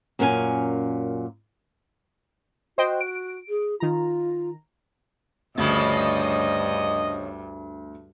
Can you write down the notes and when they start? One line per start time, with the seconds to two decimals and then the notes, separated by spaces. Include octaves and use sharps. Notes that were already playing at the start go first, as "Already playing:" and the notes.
0.19 F#2 A#2 C#4 A#4 F5 G#5
2.78 F#4 C5 D#5 G5
3.01 D7
3.49 G#4
3.80 D#3 F4 A#5
5.58 D2 G2 C#3 F3 G3 D#5